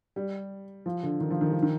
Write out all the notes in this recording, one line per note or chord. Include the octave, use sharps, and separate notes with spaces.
G3
F3
D3
D#3
F3
D#3
F3
D#3